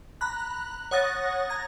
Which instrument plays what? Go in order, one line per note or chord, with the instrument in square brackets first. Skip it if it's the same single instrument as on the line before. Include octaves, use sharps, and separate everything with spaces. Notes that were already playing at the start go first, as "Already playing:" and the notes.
[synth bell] A#5 B5 F#6
C#5 F#5 D#6 F#6 A6 A#6
A#5 G#6